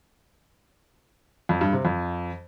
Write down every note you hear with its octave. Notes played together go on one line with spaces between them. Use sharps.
F2
G2
C3
F2